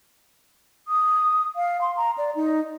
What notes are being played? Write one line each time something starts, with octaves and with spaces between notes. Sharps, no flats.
D#6
F5
C6
A#5
D5
D#4